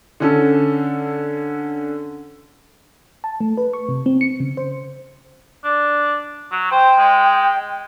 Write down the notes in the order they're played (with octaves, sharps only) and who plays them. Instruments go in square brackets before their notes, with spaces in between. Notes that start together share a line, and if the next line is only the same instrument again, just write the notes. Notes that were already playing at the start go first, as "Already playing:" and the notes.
[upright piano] D3 C#4 A4
[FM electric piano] A5
A3
B4
C#6
C3
C4
C#7
C#3
C5
[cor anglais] D4
F#3
[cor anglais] C5 [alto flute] G5
[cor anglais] G#3